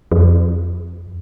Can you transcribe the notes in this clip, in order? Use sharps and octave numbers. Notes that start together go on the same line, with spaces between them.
F2